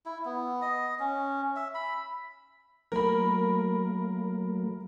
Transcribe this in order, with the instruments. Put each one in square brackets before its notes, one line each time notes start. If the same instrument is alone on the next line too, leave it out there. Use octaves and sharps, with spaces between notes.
[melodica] E4
B3
D#5
C#4
E5
B5
[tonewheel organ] F#3 A3 A#3 [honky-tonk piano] A#4 B5